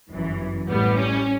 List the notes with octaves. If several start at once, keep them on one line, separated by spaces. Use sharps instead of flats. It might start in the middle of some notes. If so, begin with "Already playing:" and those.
G1 F#2 E3
A1 A2 G3 B3
C#4